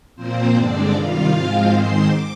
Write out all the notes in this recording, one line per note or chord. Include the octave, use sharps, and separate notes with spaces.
A#2 F3 A#3 C4 C5
G2 D3 G#3 C4 D4 D5
C3 D#3 G3 F4 F5
G#2 F3 G#3 C4
G#2 D#3 G#3 C4 C5 C6
D6